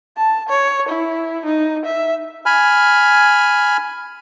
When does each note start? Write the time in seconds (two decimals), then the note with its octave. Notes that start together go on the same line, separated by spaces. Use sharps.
0.17 A5
0.49 C#5
0.89 E4
1.46 D#4
1.86 E5
2.46 G#5 B5 F6